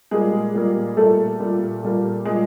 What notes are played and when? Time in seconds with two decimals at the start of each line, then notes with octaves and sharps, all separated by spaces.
0.11 A#2 G3 G#3 A#3 G#4
0.54 A#2 G3 A#3
0.97 A#2 G3 A3 A#3 A4
1.40 A#2 G3 A#3
1.83 A#2 G3 A#3
2.25 A#2 G3 G#3 A#3 G#4